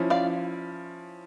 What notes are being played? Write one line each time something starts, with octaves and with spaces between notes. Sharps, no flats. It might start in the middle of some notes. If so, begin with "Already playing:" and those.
Already playing: F3 C#4 E4
D5 F5